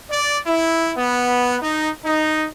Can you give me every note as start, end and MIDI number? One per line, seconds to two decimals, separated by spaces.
0.10 0.38 74
0.47 0.91 64
0.97 1.57 59
1.62 1.90 63
2.05 2.46 63